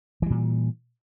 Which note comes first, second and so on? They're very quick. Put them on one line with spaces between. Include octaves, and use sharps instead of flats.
E3 G3 A#2